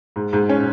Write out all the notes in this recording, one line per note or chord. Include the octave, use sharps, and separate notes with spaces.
G#2
G#2
C#4